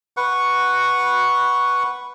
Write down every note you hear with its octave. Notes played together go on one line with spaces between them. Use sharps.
B4 F#5 C#6